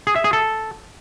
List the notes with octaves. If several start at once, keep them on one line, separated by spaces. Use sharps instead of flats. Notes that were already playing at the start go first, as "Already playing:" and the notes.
G#4
E5
G#4
A4